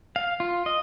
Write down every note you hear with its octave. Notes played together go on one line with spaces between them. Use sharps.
F5
F4
D#5